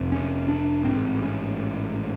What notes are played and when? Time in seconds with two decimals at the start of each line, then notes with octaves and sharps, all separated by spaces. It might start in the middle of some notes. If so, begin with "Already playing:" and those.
Already playing: F1 F2 C3
0.12 C#4
0.48 D4
0.85 A1 G#2 C4
1.22 C#4